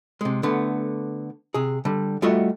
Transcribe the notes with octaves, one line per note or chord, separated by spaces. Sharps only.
C3 G#3
D3 A3 B3
C3 G#4
D3 G3
G3 A3 F4 F#4 D#5 E5